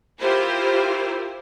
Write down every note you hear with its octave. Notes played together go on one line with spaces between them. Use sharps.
E4 F4 G4 A#4 C5